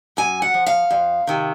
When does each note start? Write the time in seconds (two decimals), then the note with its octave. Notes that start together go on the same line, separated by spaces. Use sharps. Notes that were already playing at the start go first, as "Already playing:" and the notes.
0.17 F#2 G#5
0.42 F#5
0.54 F3
0.66 F5
0.91 F2
1.27 C3 D#3